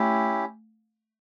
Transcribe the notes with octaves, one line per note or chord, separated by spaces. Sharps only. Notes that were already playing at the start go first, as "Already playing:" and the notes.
Already playing: A3 C#4 E4 G4